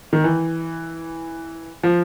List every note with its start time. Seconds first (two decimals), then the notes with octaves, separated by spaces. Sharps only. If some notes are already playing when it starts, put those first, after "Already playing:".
0.13 D#3
0.24 E3
1.83 F3